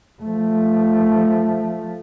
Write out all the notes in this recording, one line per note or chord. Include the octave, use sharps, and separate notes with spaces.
F3 A3